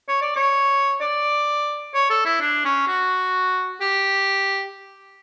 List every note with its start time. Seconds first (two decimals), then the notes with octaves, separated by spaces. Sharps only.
0.08 C#5
0.21 D5
0.36 C#5
1.01 D5
1.94 C#5
2.10 A4
2.25 E4
2.41 D4
2.65 C#4
2.88 F#4
3.81 G4